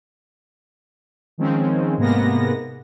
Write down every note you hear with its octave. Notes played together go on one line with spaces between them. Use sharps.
D#3 F3 G#3 C4 C#4
G#2 C3 G#3 A#3 B3 A#6